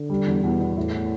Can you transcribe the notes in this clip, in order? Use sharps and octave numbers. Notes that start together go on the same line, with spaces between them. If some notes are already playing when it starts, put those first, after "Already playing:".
Already playing: D3
G3
E2
E2 B2
E2
A2 E4